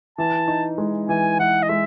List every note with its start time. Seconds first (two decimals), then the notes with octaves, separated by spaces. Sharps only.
0.18 E3 A5
0.48 D#4
0.78 G#3
1.09 E3 G#5
1.39 E3 F#5
1.63 D#5
1.69 G#3 E5